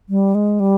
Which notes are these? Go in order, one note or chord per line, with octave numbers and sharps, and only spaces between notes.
G3
G#3
G3